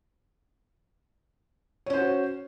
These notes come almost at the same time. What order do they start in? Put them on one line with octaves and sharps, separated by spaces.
C#5 C#4 C5 F#4